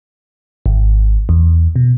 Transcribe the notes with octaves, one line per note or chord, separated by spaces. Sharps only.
G#1
E2
B2